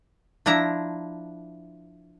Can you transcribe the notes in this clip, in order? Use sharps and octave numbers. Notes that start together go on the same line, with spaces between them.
F3 D4 E4 A#5